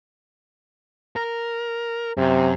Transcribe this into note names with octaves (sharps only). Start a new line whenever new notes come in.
A#4
F#2 C3